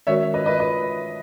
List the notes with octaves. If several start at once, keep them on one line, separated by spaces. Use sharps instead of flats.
D#3 G#3 C#4 F#4 A#4 C#5 E5
B4 D#5
B4 D#5
B4 D#5